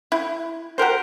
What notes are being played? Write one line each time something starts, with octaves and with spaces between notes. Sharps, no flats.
E4
F#4 G4 A#4 C5